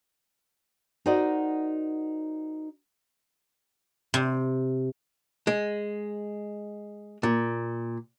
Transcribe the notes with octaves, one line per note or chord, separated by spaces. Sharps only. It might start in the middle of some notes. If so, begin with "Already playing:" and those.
D#4 F#4 A#4 C5 D5 D#5
C3
G#3
A#2